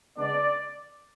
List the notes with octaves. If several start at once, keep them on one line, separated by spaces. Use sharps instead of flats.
C#3 G#3 B3 D4 D5